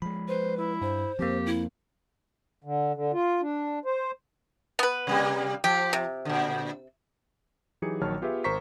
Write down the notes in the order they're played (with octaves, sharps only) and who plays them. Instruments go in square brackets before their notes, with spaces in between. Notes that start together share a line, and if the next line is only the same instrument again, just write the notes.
[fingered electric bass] F3 G#3 [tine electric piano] B5
[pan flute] B4 [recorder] C5
[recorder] E4
[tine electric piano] G2 [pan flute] C5
[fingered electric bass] F2 F3 [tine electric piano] A#3 C4 [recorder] G4
[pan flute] E4
[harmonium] D3
D3
F4
D4
C5
[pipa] B3 B4
[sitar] C3 G3 A#3
[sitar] F3 [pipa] G4
[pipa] C3
[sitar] A#2 D3
[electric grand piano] E3 F#3 D#4 G4 G#4 C#7
A#1 D#3 F#3 C#5 A5 F6
B3 F4 G4 G#4 B4 E5
G#1 A#4 C5 A#5 C#6 B6